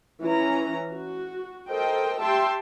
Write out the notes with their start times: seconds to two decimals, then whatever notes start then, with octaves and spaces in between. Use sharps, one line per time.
0.22 E3 C#4 A#5
0.92 F#4
1.69 A4 A#4 C5 D#5 G5
2.21 G4 E5 G5 A5 C6